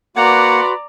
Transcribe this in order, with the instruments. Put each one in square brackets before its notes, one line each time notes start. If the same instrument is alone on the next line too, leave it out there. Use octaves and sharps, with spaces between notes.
[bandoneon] A#3 F#5 [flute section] F#4 B4 C6 [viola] D5 [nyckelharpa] A#5